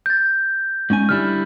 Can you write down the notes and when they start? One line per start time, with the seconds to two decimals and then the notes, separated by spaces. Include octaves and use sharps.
0.06 G6 A6
0.90 G#2 C#4 G#5
1.09 D3 G3 E4 F6